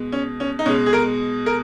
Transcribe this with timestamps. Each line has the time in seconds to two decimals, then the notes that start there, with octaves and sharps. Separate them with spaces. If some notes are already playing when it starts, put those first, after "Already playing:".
Already playing: B2 G#3
0.13 C#4
0.40 C#4
0.59 D#4
0.66 B2 G#3 C#4
0.86 G#4
0.93 A#4
1.46 A#4